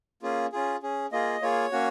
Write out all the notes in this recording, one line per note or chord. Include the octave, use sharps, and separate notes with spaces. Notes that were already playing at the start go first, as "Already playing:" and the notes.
A#3 C#4 F4 G#4
C#4 F4 G#4
C#4 G#4
A#3 F4 G#4 D#5
A#3 F4 G#4 C#5
A#3 C#4 F#4